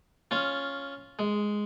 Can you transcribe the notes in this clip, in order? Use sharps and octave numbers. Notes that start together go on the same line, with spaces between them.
C#4 F4
G#3